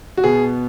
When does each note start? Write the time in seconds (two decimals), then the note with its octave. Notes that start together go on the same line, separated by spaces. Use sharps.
0.17 F#4
0.24 B2 B3 G#4